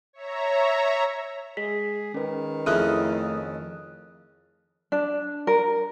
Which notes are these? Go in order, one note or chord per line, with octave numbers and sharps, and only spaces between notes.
C#5 E5 A#5
G#3 G#4 B6
D#3 C#4 B4
F2 C#3 A3 C#4 E4 D#6 F6 F#6
D4
A#4